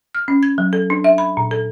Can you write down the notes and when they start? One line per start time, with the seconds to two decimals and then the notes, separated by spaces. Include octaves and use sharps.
0.15 F6
0.28 C#4
0.43 G#6
0.58 F#3
0.73 A4
0.90 D4
1.04 E5
1.18 B5
1.37 A#2
1.51 A4